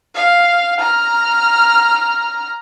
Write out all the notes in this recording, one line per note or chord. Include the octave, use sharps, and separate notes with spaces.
F5
A#5 F6